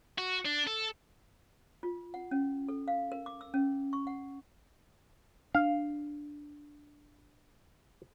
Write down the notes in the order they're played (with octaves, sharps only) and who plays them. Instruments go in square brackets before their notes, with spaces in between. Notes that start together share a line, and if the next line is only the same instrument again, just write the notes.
[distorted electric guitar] F#4
D4
A4
[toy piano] F4
F#5
C#4
A4
F5
A#4
D6
E6
C#4
C#6
F#5
[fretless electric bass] D4 [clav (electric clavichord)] F5